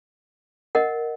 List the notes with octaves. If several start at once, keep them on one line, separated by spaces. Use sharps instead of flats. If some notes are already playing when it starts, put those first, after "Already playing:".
A#4 D#5 F#5